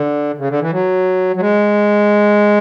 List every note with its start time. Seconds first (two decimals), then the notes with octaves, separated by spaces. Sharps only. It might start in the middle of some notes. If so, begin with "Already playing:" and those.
Already playing: D3
0.38 C#3
0.49 D3
0.61 E3
0.72 F#3
1.36 F#3
1.41 G#3